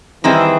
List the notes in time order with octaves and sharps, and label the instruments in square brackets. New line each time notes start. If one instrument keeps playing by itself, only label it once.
[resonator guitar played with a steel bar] D#3 G3 C4 E4 G#4 [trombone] E3